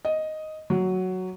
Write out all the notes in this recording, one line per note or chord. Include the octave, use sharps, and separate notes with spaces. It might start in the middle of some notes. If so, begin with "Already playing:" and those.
D#5
F#3